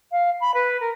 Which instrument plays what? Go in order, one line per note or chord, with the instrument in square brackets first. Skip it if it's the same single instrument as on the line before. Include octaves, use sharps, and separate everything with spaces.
[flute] F5
B5
B4
A#4